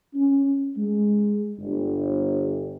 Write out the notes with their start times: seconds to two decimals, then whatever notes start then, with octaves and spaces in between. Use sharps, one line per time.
0.14 C#4
0.77 G#3
1.59 G1